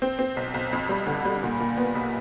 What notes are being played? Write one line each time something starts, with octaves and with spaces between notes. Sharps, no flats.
C4
C4
B1
B1
F2
G3
D3
G3
A#2
A#2
B3
B1